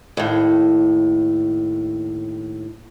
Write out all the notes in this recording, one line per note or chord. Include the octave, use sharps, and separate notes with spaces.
D#2 A2